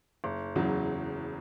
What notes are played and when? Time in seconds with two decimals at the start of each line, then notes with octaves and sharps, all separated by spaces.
0.24 F#1
0.56 E2 C#3 F#3